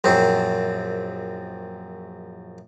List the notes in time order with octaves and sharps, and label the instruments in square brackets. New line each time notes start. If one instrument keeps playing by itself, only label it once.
[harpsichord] A#1 F#2 C4